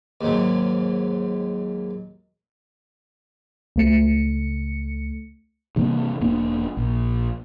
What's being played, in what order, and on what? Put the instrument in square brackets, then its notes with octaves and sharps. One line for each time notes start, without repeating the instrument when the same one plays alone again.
[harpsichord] D#2 G#2 F#3
[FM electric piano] C#2 A3 C#7
[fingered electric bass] G2 C3 E3 A#3
E1 A#3 D4
A#1